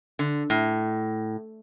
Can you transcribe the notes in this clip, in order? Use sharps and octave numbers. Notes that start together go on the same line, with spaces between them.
D3
A2